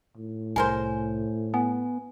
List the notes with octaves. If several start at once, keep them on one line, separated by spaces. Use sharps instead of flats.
A2
C2 G#4 A#4 C5 G#5
B3 G#5